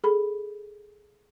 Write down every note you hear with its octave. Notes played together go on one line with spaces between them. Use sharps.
G#4 A4 B5